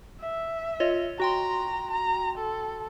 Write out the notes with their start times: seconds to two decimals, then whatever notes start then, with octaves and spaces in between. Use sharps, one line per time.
0.21 E5
0.80 F4 C#5 D#5
1.20 F#4 G5 A#5 C6
1.91 A#5
2.38 A4